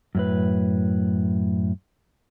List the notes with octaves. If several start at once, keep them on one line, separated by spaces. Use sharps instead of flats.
F#2 A2 B4